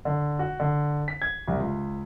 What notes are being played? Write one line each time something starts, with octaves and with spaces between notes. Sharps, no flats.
D3
F#4
D3
B6
G#6
C2
C#2